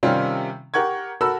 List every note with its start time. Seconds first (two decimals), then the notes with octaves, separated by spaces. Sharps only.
0.03 C3 D#3 G3 C4 C#4 F4
0.74 G4 A#4 F#5 C#6 G#6
1.21 F#4 A4 A#4 B5 E6